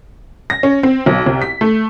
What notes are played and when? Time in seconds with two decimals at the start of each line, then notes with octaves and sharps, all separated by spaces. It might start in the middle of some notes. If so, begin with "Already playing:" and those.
0.50 A#6
0.63 C#4
0.83 C4
1.06 B1
1.26 C2
1.42 B6
1.61 A3